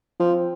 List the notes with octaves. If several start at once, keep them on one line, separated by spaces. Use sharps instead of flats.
F3 C4